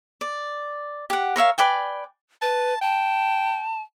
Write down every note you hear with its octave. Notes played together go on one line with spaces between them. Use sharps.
D5
G4 F#5
A#4 C#5 E5 F5
B4 D5 G5 G#5
B4 A5
G5 A5